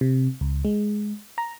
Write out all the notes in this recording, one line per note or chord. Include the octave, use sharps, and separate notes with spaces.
C3
C#2
G#3
A#5